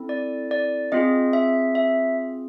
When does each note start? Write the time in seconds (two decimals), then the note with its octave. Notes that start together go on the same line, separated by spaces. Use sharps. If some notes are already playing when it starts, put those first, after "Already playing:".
Already playing: C4 E4 A4
0.09 D5
0.51 D5
0.92 C4 F4 G#4 D#5
1.33 E5
1.75 E5